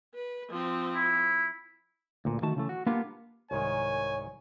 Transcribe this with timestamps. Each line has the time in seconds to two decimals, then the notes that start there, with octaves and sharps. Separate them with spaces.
0.15 B4
0.50 F3 C4
0.96 E4
2.25 D2 A#2
2.42 D#3 A3 F#4 A5
2.56 C#3 E3 A3
2.69 F#4
2.86 A#3 B3 D4 F4 G4 A#4
3.51 C2 G#2 D#3 C#5 G#5